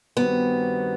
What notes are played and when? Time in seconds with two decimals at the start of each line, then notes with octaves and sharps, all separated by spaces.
0.17 G2 D#3 G3 B3 C4 F#4